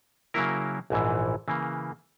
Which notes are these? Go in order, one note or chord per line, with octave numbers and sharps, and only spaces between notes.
C#3 F#3 A#3 E4 A#4
A#1 G#2 E3
C#3 E3 A#3